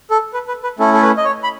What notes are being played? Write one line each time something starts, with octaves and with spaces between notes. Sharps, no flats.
A4
B4
B4
B4
A3 C#4 E4 A4
A4
B4
D#5
C#5
B5